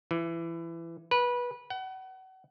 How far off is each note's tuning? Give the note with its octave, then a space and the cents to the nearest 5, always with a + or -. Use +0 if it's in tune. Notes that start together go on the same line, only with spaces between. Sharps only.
E3 +20
B4 -20
F#5 +35